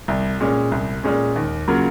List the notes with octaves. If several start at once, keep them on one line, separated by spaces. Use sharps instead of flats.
C2
A#2 G#3 C#4
C2
A#2 G#3 C#4
D#2
C#3 F#3 A#3 F4